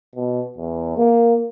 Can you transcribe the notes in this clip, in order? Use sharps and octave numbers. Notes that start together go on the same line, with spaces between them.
B2
E2
A#3